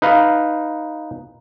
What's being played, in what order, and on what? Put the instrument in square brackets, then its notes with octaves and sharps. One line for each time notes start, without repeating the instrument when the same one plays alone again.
[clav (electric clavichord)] D#4 B4 F5